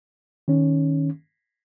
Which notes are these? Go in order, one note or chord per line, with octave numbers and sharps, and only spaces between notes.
D#3 C#4